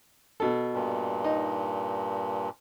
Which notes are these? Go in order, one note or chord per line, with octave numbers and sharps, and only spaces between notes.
B2 A4
G2 A#2
D#4